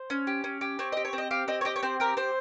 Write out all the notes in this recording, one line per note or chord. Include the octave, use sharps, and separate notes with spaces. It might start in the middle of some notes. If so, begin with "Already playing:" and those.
Already playing: C5
C#4
G4
C#4
G4
C4 C#5
D#5
G4
C#5
C4
D#5
G4 F5
C4 D#5
C#5
G4 D#5
C#5
C4 C5
G4 A#4
C4 C5